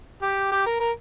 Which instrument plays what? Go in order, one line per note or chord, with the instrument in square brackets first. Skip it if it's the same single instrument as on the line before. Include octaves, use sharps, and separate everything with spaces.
[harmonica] G4
G4
A#4
A#4